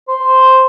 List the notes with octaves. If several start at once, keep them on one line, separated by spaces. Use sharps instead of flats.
C5